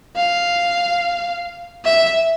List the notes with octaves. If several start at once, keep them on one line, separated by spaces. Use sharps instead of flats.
F5
E5